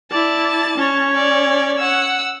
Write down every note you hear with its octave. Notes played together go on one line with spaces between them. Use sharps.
E4 D5 A5
C#4 C#5
D5
F#5 E6